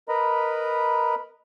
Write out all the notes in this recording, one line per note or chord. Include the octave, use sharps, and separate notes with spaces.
A#4 B4 D#5 A#5 B5